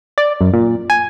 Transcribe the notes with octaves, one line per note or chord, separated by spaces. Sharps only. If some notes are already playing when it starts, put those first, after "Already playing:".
D5
F#2
A#2
G#5